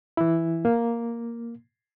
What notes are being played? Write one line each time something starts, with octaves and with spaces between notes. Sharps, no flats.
E3 E4
A#3